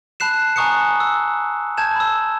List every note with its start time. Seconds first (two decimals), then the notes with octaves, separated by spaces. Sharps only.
0.20 A5 B5 F#6 C7 E7
0.56 G#5 A#5 C#6 D#6 F#6 C#7
1.00 E6
1.77 A5 G6 G#6 E7
1.96 B5 E6